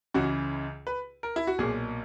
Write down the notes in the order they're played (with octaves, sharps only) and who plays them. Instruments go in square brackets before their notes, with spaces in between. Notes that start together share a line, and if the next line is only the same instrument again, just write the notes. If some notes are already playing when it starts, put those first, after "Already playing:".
[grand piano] C#2 C#3 E3 F#4
B4
A#4
E4
F#4
B1 A#2 G#4